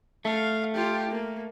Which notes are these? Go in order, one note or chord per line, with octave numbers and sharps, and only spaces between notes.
A3 F5
F4 G4
A#3